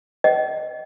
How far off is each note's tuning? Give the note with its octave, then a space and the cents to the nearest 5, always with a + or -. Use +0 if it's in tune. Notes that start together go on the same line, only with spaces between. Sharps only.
D#5 +0 G5 -45